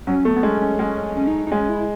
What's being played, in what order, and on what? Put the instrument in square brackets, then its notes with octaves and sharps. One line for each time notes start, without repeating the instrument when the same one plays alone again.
[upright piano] F#3 [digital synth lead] C#4
[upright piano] A3 [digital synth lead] B3
[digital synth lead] B3
[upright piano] G#3 [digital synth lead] C#4
[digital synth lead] C#4
[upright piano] G#3 [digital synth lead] C#4
[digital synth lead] C#4
C#4
D#4
D#4
[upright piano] G#3 [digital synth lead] C#4
[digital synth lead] E4